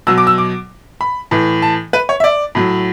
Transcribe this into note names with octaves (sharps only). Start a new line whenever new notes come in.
B2 F#3 E6
D6
E6
D6
B5
A2 E3
A5
B4
C#5
E5
D5
A2 F#3